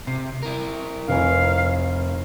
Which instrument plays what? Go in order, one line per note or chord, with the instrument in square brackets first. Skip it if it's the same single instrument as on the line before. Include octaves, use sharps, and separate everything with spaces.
[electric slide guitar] C3 [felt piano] C7
[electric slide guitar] E4 A#4
[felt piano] F1 B4 G#5 [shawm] F5